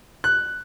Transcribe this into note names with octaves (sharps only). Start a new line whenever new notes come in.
F#6